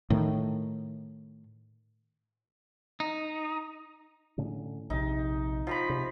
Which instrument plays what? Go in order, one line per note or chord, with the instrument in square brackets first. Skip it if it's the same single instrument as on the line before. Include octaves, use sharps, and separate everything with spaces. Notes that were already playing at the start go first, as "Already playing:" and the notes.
[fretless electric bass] A2 D#3
[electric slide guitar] D#4
[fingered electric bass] A2 D3 C#4
[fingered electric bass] A#1 C3 [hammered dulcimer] D#4
[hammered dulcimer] F3 A#5 B5
[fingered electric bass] C3